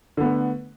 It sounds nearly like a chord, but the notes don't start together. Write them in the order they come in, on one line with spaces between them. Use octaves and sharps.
D3 B3 A3